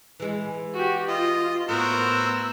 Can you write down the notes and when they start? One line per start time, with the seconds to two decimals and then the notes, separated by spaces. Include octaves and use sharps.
0.20 E3 G#3
0.74 F#4 G4
1.08 F4 D#5
1.69 A2 B3 F#4 A#4 C5 E6